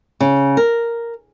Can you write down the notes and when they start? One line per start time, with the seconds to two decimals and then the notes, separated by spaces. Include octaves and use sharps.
0.20 C#3
0.57 A#4